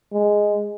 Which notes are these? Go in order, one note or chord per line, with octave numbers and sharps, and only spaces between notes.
G#3